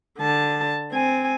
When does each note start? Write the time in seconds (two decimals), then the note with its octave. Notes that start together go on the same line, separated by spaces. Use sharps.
0.19 D3 A5
0.92 C4 G#5